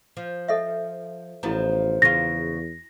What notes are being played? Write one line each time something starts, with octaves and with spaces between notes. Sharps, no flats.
F3
A4 D#5 E5
A1 F3 B3 E4 F#4 A#5
E2 C#3 F4 A#6